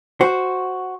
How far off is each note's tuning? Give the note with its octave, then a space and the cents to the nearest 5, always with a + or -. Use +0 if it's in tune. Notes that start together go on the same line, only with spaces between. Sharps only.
F#4 +0 C5 +0